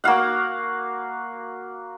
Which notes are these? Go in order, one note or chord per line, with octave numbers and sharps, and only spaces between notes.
A#3 F#4 F5 F#5